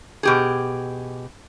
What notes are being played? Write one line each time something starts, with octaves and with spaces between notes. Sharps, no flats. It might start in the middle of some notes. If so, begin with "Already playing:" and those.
B2 G4 G#4